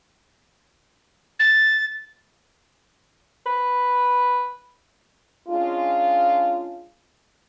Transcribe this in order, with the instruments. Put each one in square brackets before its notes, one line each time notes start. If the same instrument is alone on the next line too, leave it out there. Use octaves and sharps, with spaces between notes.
[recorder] A6
[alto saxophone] B4
[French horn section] G#3 C#4 D4 F4